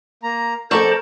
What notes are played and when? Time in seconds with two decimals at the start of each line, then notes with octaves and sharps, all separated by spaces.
0.23 A#3 A#5
0.71 F2 F4 A4 A#4 C5 D5 A5 C#6